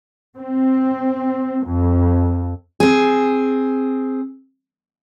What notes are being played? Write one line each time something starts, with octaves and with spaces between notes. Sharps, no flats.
C4
F2
C4 G#4